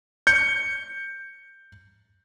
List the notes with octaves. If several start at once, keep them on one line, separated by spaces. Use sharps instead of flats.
G6 C#7